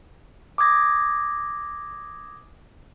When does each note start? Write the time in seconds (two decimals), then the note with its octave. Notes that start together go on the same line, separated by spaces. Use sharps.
0.58 D6 D#6 G#6 A#6